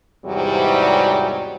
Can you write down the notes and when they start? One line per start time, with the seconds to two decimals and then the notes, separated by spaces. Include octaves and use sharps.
0.24 E2 G#2 C3 F#3 G3